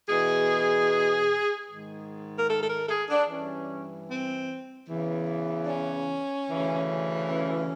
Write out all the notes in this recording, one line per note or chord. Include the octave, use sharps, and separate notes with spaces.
E2 B2 G#4
G#2 D#3
A#4
A4
A4
A#4
A4
G#4
D4
G2 E3 C#4
C4
E2 C#3 E3
D4
C#4
D2 C#3 E3
C#4